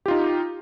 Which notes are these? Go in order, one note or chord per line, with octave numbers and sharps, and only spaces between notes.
D#4 F4 G4